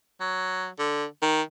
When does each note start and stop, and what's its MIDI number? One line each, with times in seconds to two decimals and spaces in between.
0.21 0.67 54
0.78 1.05 50
1.22 1.42 51